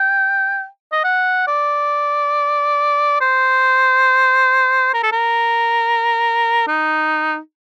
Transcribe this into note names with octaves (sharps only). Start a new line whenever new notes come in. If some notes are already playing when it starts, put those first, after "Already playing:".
Already playing: G5
D#5
F#5
D5
C5
A#4
A4
A#4
D#4